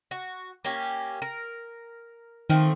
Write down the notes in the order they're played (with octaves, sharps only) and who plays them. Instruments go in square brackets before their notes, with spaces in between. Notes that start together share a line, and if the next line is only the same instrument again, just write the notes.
[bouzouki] F#4
A#3 C#4 G4
A#4
[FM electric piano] D#3 [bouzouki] F3 A3 C4